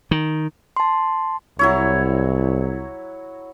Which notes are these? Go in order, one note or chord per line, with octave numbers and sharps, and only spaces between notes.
D#3
A5 C6
C2 F#3 E4 C#5